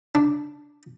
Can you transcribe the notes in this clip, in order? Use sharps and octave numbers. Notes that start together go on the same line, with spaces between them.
D4